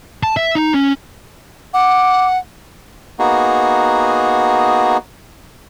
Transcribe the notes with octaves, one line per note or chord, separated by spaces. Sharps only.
A5
E5
D#4
C#4
F#5 D6
A#3 B3 D#4 F#4 G#4